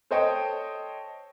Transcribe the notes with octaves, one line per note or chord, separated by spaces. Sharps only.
A4 C5 C#5 D#5 G5 A5